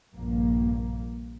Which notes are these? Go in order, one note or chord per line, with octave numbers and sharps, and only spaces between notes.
A#1 G2 A#3